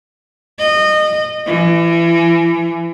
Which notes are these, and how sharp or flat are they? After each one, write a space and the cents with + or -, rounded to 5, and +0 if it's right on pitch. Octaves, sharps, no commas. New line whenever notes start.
D#5 -25
E3 +30